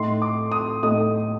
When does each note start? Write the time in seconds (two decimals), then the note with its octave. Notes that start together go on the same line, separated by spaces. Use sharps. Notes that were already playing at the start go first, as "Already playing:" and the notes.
Already playing: A2 A3 D#4 C6
0.22 D6
0.52 D#6
0.83 A2 A3 D#4 D#6